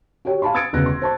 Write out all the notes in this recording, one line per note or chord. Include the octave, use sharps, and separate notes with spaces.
F#4 G4 C#5 G5
F5 G#5 A5 B5 C6
D#6 E6 G#6 A6 C#7 D7
E1 C#2 B3 F#6 A#6
C6
C5 A5 C6